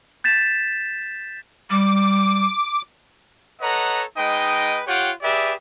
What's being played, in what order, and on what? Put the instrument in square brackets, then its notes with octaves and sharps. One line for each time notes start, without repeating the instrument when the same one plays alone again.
[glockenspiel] G6 A6 B6 E7
[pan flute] G3 [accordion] D6
[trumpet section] A4 B4 C#5 D#5 F#5 A#5
G#3 D#4 B4 D#5 G5
F4 G4 C#5 F#5 G5
G4 G#4 B4 D5 E5